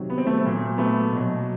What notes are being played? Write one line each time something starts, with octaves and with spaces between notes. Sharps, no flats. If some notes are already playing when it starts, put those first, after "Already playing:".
Already playing: C3 D#3 F#3
B3
C4
A3 B3
A#2 F#3
A3 B3
B2 F#3